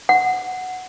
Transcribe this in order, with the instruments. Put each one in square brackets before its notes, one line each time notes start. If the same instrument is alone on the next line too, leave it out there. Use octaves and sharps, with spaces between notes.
[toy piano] F#5